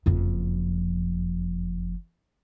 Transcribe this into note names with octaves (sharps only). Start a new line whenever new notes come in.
F#1 F2